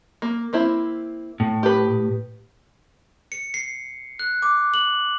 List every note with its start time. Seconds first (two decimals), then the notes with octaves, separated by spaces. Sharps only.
0.22 A#3
0.53 A#3 C4 E4
1.40 A2
1.63 G4 B4
3.32 C#7
3.54 C7
4.19 F#6
4.42 D6
4.74 F#7